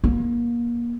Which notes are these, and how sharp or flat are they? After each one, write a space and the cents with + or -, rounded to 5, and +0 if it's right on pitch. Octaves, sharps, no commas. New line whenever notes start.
A#3 +30